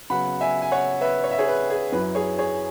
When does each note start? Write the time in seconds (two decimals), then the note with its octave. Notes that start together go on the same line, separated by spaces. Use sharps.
0.10 C#3 F#3 B3 F#5 B5
0.41 E5 G#5
0.62 G#5
0.71 C#5 F#5
1.01 B4 E5
1.24 C#5
1.31 E5
1.39 G#4 C#5
1.48 B4
1.70 G#4
1.92 F#2 F#3 E4 B4
2.15 G#4 C#5
2.38 G#4 C#5